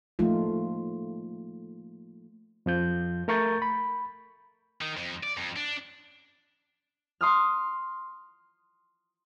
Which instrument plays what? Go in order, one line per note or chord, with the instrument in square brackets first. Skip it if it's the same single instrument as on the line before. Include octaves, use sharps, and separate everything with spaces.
[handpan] F3 A3 A#3 D#4 F4
[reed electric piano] F2 F3 G6
A3 A#4 C#6 G6 A6
B5
[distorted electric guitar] D#3
F2
D5
F2
D4
[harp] C6 D#6 F6